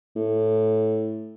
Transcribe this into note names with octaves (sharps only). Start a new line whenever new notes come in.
A2